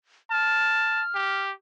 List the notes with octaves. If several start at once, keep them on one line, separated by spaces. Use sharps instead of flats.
A5 F6
G4